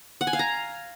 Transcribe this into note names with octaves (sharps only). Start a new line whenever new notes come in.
F#5
G#5
F5
A#5